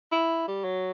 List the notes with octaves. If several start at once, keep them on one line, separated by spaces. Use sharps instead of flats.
E4
G3
F#3